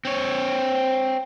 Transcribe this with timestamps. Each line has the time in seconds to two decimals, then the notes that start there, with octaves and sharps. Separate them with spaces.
0.05 C4 C#5